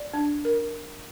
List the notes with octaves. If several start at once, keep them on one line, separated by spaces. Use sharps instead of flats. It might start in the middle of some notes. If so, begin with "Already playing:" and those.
Already playing: D5
D4
A#4